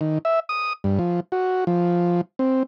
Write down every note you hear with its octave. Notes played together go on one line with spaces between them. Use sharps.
D#3
E5
D#6
G2
F3
F#4
F3
C4